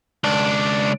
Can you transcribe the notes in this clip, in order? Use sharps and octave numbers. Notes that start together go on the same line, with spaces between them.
C#2 D4